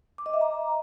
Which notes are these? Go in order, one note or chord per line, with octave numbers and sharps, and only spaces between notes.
D6
D#5
E5
A#5